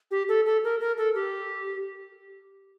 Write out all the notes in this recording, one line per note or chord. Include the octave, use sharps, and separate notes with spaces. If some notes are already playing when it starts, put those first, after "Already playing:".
G4
A4
A4
A#4
A#4
A4
G4